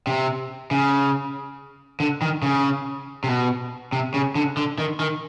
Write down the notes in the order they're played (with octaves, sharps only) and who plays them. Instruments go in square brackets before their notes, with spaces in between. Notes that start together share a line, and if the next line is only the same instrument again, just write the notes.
[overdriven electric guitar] C3
C#3
D3
D#3
C#3
C3
B2
C3
C#3
D3
D3
D#3
D#3